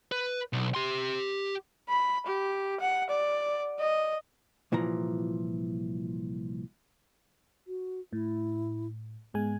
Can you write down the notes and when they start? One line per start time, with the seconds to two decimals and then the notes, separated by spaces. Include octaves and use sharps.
0.12 B4
0.53 B1
0.75 G4 C6
1.89 B5
2.26 G4
2.80 F#5
3.10 D5
3.79 D#5
4.72 C2 A#2 E3 F3 A#5
7.67 F#4
8.13 A2 E4
9.34 G#2 G#3 B3 G#5